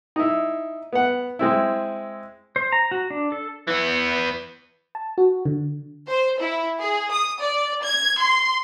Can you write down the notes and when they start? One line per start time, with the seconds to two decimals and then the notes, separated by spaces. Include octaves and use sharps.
0.16 D#4 E4
0.93 B3 F#5
1.39 G#3 C4 E4
2.56 C5
2.72 A#5
2.91 F#4
3.10 D4
3.32 A4
3.67 E3 B3
4.95 A5
5.18 F#4
5.45 D3
6.08 C5
6.40 E4
6.81 G#4
7.11 D#6
7.40 D5
7.85 G#6
8.19 C6